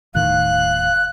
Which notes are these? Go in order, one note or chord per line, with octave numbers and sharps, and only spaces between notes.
D#1 A2 D#3 F5 F#6